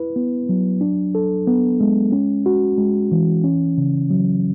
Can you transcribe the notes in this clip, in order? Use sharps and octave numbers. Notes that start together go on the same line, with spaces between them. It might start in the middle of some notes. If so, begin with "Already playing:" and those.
Already playing: E4 B4
B3
F#3
D4
A4
B3
G#3
C#4
F#4
G#3
E3
C#4
C#3
F#3